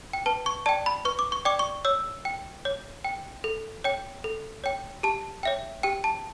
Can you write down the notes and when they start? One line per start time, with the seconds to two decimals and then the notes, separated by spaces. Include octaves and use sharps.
0.13 G5
0.26 B4 A5
0.46 C#6
0.66 D5 G5 A5
0.86 B5
1.05 B4 C#6
1.19 D6
1.32 C#6
1.45 D5 G5 D6
1.59 C#6
1.85 C#5 E6
2.25 G5
2.65 C#5
3.04 G5
3.44 A4
3.84 C#5 G5
4.24 A4
4.64 C#5 G5
5.03 G4 A5
5.43 C#5 E5 G5
5.83 G4 G5
6.04 A5